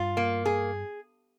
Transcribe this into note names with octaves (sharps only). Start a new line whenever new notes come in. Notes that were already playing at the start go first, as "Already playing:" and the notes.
Already playing: G2 F4
A#3
G#4